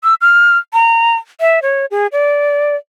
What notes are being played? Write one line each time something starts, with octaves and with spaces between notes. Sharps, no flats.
E6
F6
A#5
E5
C#5
G#4
D5